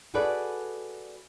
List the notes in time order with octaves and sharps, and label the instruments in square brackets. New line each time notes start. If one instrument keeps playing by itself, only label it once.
[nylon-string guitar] F#4 G#4 A4 B4 D5